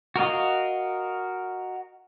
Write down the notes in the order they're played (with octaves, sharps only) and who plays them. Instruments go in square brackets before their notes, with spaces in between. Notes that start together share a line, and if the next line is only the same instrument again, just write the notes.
[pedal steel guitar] F#4 A#4 D#5 F5